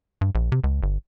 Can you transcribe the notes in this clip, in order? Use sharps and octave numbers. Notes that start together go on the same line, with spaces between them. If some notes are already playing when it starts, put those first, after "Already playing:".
G2
A#1
C3
C#2
G1